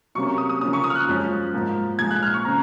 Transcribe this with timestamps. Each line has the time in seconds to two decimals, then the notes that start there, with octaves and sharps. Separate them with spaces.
0.15 C3 F#3 A#3 C#4 C#6
0.27 C#6
0.38 D#6
0.49 D#6
0.61 C#3 F3 A#3 C#4 D#6
0.73 C#6
0.84 D#6
0.90 F6
0.95 F#6
1.07 F#2 F3 G#3 C#4
1.53 G#2 F3 A#3
1.99 A#2 F3 G#3 G#6
2.11 F#6
2.23 F6
2.34 C#6
2.45 C#3 F3 C4 A#5